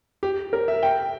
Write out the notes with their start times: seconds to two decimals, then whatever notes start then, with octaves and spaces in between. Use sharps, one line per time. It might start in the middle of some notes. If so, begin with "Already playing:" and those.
0.23 G4
0.53 A#4
0.68 E5
0.83 G5